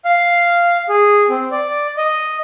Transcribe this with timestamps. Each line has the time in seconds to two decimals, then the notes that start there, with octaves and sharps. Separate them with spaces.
0.05 F5
0.89 G#4
1.29 C4
1.51 D5
1.97 D#5